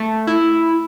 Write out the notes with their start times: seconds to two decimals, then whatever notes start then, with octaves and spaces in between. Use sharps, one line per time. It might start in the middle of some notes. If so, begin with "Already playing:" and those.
Already playing: A3
0.27 E4